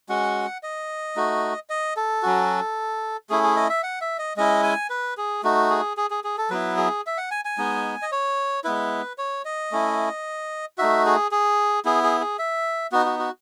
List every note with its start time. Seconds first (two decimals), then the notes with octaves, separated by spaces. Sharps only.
0.09 G#3 C#4 F#4 F#5
0.63 D#5
1.16 A3 D#4 F#4
1.70 D#5
1.97 A4
2.23 F#3 C#4 F#4
3.30 A3 C#4 E4 G#4
3.43 G#4
3.56 D#5
3.69 E5
3.83 F#5
4.01 E5
4.18 D#5
4.37 G#3 C#4 E4 D#5
4.63 G#5
4.90 B4
5.17 G#4
5.43 A3 D#4 F#4
5.70 G#4
5.97 G#4
6.10 G#4
6.24 G#4
6.38 A4
6.50 F#3 B3 E4 B4
6.77 G#4
7.07 E5
7.18 F#5
7.31 G#5
7.45 G#5
7.58 G#3 B3 D#4
8.02 D#5
8.12 C#5
8.64 G#3 B3 E4 B4
9.18 C#5
9.45 D#5
9.72 A3 C#4 E4
10.78 A3 D#4 F#4 E5
11.06 G#4
11.31 G#4
11.85 B3 E4 G#4
12.03 G#4
12.21 G#4
12.39 E5
12.92 B3 D#4 F#4
13.06 F#4
13.19 F#4